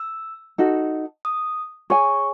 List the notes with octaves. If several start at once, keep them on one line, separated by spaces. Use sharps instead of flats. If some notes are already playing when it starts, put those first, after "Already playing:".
Already playing: E6
D#4 F#4 A4
D#6
G#4 C#5 G#5 C#6